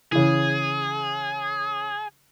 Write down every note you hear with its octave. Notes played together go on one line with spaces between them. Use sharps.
C#3 E3 G#4